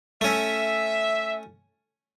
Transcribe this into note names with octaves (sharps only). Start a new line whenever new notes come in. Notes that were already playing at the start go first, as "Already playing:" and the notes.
A3 C#4 E5